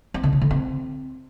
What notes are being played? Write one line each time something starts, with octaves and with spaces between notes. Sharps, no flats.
C4
D3
C#3
D3
C4